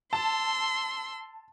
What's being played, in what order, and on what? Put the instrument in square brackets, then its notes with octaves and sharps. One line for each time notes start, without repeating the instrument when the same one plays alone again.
[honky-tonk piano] A5 [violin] C6 E6